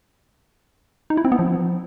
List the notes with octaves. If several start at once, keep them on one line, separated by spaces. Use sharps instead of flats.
D#4
E4
C4
B3
F3